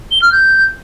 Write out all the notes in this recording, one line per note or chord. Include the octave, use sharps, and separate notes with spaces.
G7
F6
G6